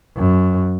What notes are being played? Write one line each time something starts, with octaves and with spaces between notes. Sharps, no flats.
F#2